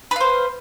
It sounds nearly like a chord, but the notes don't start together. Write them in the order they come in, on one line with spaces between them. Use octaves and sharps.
B4 F5 C5